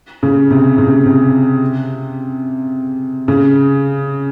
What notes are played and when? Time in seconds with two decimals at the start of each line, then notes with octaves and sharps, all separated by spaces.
0.23 C#3
0.50 C3
0.78 C#3
0.87 C3
1.06 C3
3.28 C#3